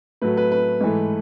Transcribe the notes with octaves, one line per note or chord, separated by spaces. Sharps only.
A2 F#3 A3 B4
B4
B4
G#2 E3 A3